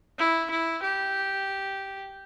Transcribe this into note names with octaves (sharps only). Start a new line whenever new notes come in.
E4
E4
G4